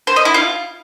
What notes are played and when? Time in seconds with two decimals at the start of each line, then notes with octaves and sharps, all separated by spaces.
0.07 C5
0.16 D#5
0.25 E4
0.34 F4